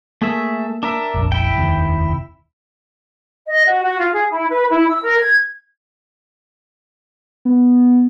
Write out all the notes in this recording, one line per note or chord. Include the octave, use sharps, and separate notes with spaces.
A3 A#3 G#4 E5
D4 A#4 E5
F1 A#1
E4 G5
F1 D#2 C3
D#5
F#4
F#4
F4
G#4
E4
B4
E4
E6
A#4
G#6
B3